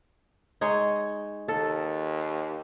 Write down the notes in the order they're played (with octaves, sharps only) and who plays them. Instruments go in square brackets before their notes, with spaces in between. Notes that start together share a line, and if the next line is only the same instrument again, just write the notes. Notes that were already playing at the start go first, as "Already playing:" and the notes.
[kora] G#3 D#4 C#5
[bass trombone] D#2 [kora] A4